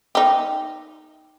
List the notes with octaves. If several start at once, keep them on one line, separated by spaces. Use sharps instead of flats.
D#4 G4